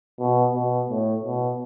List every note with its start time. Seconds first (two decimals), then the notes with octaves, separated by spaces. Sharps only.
0.20 B2
0.55 B2
0.89 A2
1.24 B2